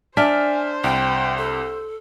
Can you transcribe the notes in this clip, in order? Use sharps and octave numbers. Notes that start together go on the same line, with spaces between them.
D4 C5 E5 G#5 F6 B6
C2 G5
A4